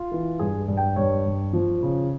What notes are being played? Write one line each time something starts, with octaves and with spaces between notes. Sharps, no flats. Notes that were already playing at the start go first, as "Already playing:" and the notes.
Already playing: F4
E3
G2 G#4
G2
G5
G2 C#5
G2
F3
C#3